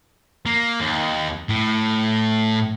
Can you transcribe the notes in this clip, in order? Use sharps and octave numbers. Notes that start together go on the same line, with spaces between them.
A#3
D#2
A2